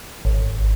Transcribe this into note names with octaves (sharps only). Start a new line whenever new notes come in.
G#1